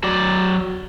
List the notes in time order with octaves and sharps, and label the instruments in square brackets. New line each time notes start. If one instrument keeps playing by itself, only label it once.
[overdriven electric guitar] F#3 D5